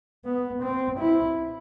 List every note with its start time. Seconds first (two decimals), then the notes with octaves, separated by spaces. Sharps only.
0.25 B3
0.62 C4
0.99 E4